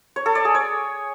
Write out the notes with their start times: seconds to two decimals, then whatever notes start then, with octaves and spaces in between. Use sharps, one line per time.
0.16 C#5
0.26 A4
0.35 D5
0.45 G#4
0.54 C#5